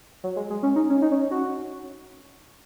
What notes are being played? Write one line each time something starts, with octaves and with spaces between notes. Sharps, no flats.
F#3
G#3
G#3
C#4
D#4
C#4
D#4
C#4
F#4